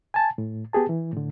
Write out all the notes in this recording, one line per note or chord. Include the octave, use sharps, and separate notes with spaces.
G#5 A5
A2
B3 G4 G#4 A5
E3
A2 D3